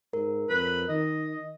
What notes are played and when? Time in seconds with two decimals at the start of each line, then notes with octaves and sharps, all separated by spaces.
0.13 G#2 A#4
0.50 F2 B4
0.89 D#3 D#5